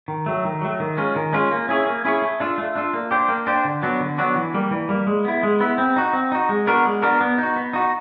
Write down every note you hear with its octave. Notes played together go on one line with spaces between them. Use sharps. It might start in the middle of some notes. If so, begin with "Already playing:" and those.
D#3
F#3 A3
D#3
F#3 A3
D#3
G#3 C#4 F4
D#3
G#3 C#4 F4
A#3
C#4 E4 G#4 C#5
A#3
C#4 E4 G#4 C#5
A3
D4 F4 A4
A3
D4 F4 A4
A#3
D4 G4 C5
A#3
D4 G4 C5
D3
F#3 B3 D4 F#4
D3
F#3 B3 D4 F#4
E3
G3 A#3
E3
G3 A#3
G#3
B3 E4
G#3
B3 E4
C4
D#4 F#4
C4
D#4 F#4
G#3
B3 D4 F#4 A#4
G#3
B3 D4 F#4 A#4
B3
D#4 F#4
B3
D#4 F#4